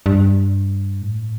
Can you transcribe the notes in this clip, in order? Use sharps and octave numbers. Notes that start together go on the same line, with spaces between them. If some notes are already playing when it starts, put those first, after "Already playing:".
G2
A2